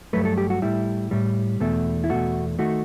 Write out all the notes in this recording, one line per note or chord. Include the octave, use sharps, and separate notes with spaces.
G2 F#3 A3 B4
A4
G4
F#4
A2 G3 E4
A2 G3
E2 B2 A3
E4
E2 B2 A3 F#4
D#3 A3 F#4